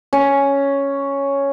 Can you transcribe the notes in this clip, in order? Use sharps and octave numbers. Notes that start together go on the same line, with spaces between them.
C#4